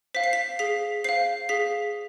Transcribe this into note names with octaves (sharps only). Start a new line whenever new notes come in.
C5 F5 B6
C7
B6
G#4 B6
C5 F5 C7
G#4 B6